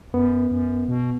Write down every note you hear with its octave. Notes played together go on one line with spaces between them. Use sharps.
F#2 B3
F#2
B2